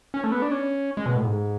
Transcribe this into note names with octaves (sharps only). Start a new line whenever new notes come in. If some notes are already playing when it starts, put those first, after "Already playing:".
C#4
A3
B3
D4
C#4
G#3
B2
A2
G#2